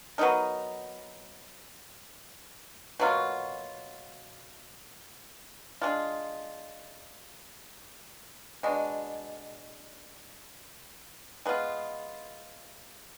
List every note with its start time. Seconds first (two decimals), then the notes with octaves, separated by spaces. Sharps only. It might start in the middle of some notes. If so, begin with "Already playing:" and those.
0.18 F#3 B3 D#4 A#4
3.00 B2 F#3 A#3 F4
5.82 G#3 D4 F4
8.63 B2 G#3 D4
11.46 G#3 B3 F4